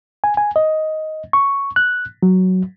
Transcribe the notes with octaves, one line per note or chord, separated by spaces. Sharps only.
G#5
G#5
D#5
C#6
F#6
F#3